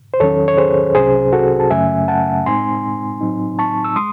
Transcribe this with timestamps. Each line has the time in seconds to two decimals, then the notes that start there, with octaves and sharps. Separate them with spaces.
0.14 C5
0.20 E2 D#3 F#3 C#4 A4 C#5
0.48 C#5
0.58 G#4 C5
0.95 C2 C3 F#3 C#4 G#4 C5
1.33 F#4 A4
1.60 A5
1.70 F#2 C#3 F#3 A3 C#4 E5 G#5
2.08 F#5 A5
2.45 A2 G#3 C4 D#4 G#5 C6
3.21 A2 F#3 C4 D#4
3.59 A5 C#6
3.84 E6
3.96 G#3 C6 D#6